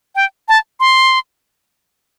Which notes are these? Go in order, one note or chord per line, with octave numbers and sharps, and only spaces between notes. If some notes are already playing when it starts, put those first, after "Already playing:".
G5
A5
C6